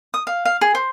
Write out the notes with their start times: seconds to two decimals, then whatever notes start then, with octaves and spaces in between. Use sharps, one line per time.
0.14 D#6
0.27 F5
0.45 F5
0.61 G#4
0.75 C5